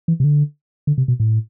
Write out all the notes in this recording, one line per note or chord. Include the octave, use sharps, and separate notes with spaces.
E3
C3
D3
D3
C3
B2
A2